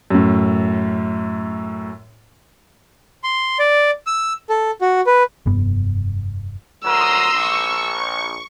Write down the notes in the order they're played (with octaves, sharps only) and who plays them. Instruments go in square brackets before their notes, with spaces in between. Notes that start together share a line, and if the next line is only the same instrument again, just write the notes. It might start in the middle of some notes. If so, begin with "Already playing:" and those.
[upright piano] F#2 A2
[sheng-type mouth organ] C6
D5
E6
A4
F#4
B4
[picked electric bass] F1 G2 B3
[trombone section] D2 F#3 A#4 [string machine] A#5 C6 D#6 [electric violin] E6
[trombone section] A#1 [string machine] C#6